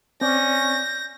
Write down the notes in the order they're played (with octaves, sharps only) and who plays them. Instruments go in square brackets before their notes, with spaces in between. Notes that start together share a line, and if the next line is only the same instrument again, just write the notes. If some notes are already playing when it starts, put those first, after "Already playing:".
[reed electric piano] C4 D5 [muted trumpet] C#4 [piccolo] G6 [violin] A#6